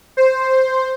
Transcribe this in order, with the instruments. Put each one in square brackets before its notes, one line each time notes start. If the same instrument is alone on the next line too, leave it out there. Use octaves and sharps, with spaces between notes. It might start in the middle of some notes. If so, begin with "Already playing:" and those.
[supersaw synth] C5